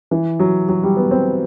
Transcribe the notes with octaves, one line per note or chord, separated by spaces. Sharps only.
E3
F#3
F#3
G3
B3
C4